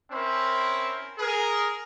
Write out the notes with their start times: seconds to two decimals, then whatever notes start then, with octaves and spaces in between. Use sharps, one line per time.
0.12 C4 C#4 E4 A#4 C5
1.19 G#4 A#4